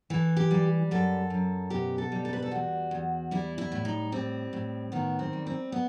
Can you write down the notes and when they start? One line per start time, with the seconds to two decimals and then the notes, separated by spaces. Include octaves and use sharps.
0.10 E3 A4
0.36 G4
0.51 G3
0.91 F#2 A4
1.30 F#2
1.70 B2 G4
1.98 A4
2.12 G3
2.25 A4
2.33 B4
2.42 A4
2.51 E2 F#4
2.91 E2
3.31 G3 E4
3.58 E4
3.72 A2
3.85 D#4
4.12 G3 C4
4.53 A2
4.92 D#3 B3
5.19 C4
5.33 G3
5.47 C4
5.72 B3